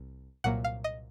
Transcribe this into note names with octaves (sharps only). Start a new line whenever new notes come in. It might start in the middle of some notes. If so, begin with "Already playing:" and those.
Already playing: C2
C2 A#2 F#3 A#3 F#5
F5
D#5